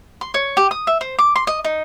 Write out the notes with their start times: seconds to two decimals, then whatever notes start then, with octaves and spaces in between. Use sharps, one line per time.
0.21 C6
0.34 C#5
0.57 G4
0.71 D#6
0.87 E5
1.01 C5
1.19 D6
1.36 C6
1.47 D#5
1.65 D#4